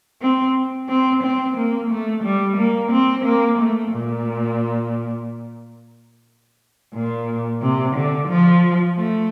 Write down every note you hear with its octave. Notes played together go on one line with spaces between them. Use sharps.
C4
C4
C4
A#3
A3
G3
A#3
C4
A#3
A3
A#2
A#2
C3
D3
F3
A3